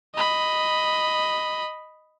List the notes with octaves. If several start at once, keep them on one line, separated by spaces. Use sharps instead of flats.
D#5 B5